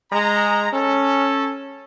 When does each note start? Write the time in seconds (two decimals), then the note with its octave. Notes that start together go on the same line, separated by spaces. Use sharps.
0.12 G#3 A#5
0.73 C#4 A4